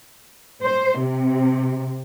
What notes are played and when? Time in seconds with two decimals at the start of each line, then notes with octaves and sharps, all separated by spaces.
0.63 C5
0.99 C3